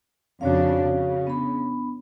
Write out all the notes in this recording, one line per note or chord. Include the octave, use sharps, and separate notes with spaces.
F2 C#3 D4 F#4 C#5 F5
C#3
B3 D4 B5